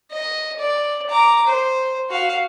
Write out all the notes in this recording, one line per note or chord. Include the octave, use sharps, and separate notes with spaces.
D#5
D5
A#5 D6
C5
F#4 F5